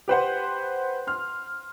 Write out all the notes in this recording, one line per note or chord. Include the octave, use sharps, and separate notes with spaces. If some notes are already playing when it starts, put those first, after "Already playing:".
G4 B4 C5 F#5
C6 F6